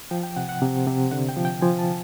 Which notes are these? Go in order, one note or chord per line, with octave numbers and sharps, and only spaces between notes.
F3 G5
G5
C3 F#5
F#5
C3
C3
D3 F#5
G5
F3
G5
F3 G#5
A5